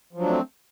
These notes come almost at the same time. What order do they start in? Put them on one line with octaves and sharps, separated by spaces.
F3 F#3 D4 A3 C4